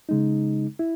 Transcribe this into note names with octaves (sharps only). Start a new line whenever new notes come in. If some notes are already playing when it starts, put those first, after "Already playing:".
C#3 G#3 D#4
E4